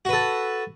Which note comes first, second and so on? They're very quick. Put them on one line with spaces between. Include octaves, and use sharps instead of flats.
F#4 B4 A4